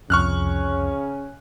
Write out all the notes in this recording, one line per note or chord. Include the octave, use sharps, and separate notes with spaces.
C2 F2 C#3 C#4 C#6 F6 F#6